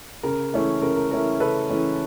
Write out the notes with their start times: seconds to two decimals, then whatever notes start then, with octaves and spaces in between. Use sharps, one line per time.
0.23 C#3 A#4
0.53 E3 A3 C#4 E4
0.82 C#3 A#4
0.96 A#4
1.11 E3 A3 C#4 E4 A#4
1.40 C#3 A4 B4
1.69 E3 A3 C#4 E4